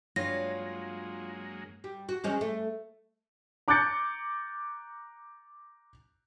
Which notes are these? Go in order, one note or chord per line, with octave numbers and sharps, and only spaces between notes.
G2 F#3 G#3 A#3 F4 C#5 A#6 D#7
G3
F#4
F3 G#3 C#4
A3
A#5 D6 F#6 G6 A6 C#7